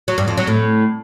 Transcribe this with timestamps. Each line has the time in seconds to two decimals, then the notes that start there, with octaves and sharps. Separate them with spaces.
0.08 F#3
0.18 G2
0.28 F2
0.37 F#3
0.47 A2